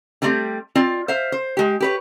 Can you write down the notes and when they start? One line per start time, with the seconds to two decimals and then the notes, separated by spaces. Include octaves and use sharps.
0.22 D3 G3 A3 C4 G4
0.75 C4 F4 D5
1.08 C5 E5 F5
1.32 C5
1.57 G#3 G4
1.80 G4 B4 C#5